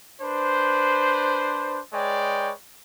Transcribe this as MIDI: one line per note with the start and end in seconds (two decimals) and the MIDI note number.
0.21 1.79 62
0.21 1.79 71
0.21 1.79 72
1.93 2.51 56
1.93 2.51 71
1.93 2.51 73
1.93 2.51 74
1.93 2.51 79